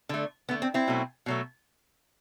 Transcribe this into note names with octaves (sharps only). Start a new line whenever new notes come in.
D3 A3
D3 A3 B3
C4
C4 E4
B2 F#3 A3
B2 F#3 A3